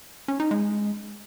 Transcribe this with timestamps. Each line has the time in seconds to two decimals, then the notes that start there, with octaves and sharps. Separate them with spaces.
0.28 C#4
0.40 D#4
0.51 G#3